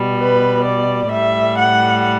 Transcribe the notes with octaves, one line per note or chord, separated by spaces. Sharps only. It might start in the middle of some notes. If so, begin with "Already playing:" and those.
Already playing: B2 G3
B4
D5
A2 G3 E5
F#5